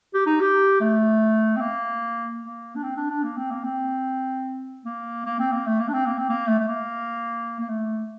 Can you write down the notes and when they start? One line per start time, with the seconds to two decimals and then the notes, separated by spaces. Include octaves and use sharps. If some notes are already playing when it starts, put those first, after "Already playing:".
0.14 G4
0.26 D#4
0.41 G4
0.81 A3
1.56 C4
1.61 A#3
2.43 A#3
2.76 D4
2.82 C4
2.97 D4
3.10 D4
3.23 A#3
3.37 C4
3.51 A#3
3.64 C4
4.85 A#3
5.26 A#3
5.39 C4
5.52 A#3
5.66 A3
5.80 A#3
5.89 D4
5.93 C4
6.06 A#3
6.18 C4
6.29 A#3
6.47 A3
6.59 A3
6.67 A#3
7.60 A#3
7.69 A3